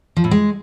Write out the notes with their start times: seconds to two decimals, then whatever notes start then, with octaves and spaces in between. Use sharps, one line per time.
0.17 F3
0.24 A2
0.31 G#3